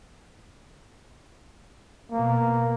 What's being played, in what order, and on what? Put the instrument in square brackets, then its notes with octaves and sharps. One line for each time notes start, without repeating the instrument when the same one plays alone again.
[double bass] B2 [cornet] A#3